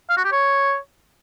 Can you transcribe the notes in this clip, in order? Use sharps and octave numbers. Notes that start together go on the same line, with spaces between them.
F5
F#4
G4
C#5